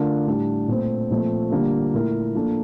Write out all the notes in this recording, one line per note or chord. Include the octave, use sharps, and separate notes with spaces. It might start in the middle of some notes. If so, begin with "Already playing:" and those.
Already playing: D3 A3 D4 F4 A#4
A2 G3 D4
A#2 A3 C4
A#2 F3 A3 C4
D3 G3 A#3 D4 F4
A#2 A3 E4 A#4
F3 A#3 D4 A4